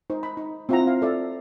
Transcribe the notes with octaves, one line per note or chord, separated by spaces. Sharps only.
D#4 C5
B5
D#4
C4 E4 F4 E5 F#5 A#5
F5
A4 D5 E5